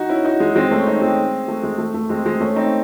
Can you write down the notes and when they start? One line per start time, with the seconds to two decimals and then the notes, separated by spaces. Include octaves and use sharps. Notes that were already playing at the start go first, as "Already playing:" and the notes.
Already playing: D#4 F#4
0.09 C#4 E4
0.25 D#4 F#4
0.40 G#3
0.56 G#3 C4
0.71 A3 C#4
0.87 C4 D#4
1.01 G#3 C4
1.48 A3
1.63 G#3
1.78 A3
1.94 A3
2.09 G#3 C4
2.25 G#3 C4
2.40 A3 C#4
2.56 C4 D#4